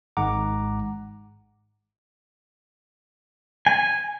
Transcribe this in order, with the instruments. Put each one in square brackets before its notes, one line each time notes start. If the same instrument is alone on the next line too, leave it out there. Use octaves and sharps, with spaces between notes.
[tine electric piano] G#1 G#2 G#3 F#5 A#5 D6
[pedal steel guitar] G#5